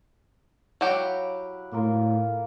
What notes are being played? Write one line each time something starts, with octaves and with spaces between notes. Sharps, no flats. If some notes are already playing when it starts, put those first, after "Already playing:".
F#3 E4 G4 F5 F#5
A2 A#3 F4 A#4